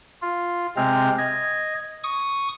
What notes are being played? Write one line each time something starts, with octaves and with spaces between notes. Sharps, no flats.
F4
C3 G#3 C4 F6
D#5 G#6
C#6 D#6